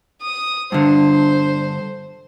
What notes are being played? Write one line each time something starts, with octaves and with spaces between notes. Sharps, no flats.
D#6
G2 D3 C5